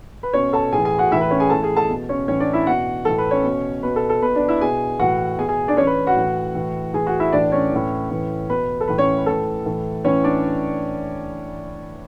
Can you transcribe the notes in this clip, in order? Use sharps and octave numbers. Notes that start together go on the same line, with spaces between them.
B4
B2 C#4 C#5
A4 A5
A2 G#4 G#5
E3
G#4 G#5
F#4 F#5
A2 E3 E4 E5
B4
C#4 C#5
G#4 G#5
A2 E3 A4 A5
G#4 G#5
A4 A5
B2
C#4 C#5
A2 E3 C#4 C#5
D4 D5
E4 E5
B2 F#4 F#5
A2 E3 A4
B4
C#4 C#5
B2
B2 B4
A4
A4
B2 B4
D4 D5
E4 E5
B2 G#4 G#5
A2 E3 F#4 F#5
B2 G#4 G#5
G#4 G#5
D4 D5
A2 E3 C#4 C#5
B4
F#4 F#5
A2 E3
A2 E3
A2 E3 G#4 G#5
F#4 F#5
E4 E5
A2 E3 D4 D5
C#4 C#5
A2 E3
A2 E3
B2 B4
A4
A2 E3 B4
C#4 C#5
B4
A2 E3 A4
A2 E3 A4
A2 E3 C#4 C#5
D4 D5